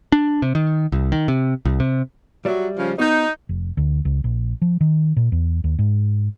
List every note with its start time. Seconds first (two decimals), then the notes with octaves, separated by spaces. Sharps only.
0.12 D4
0.42 C3
0.55 D#3
0.92 C2
1.12 D#3
1.28 C3
1.65 C2
1.80 C3
2.45 F#3 G3 D5 E5
2.76 C#3 F3
2.98 B3 D#4 F#4 C5
3.49 F1
3.77 D2
4.05 C#2
4.24 A#1
4.62 F3
4.81 D#3
5.17 A#2
5.32 E2
5.64 D#2
5.79 G#2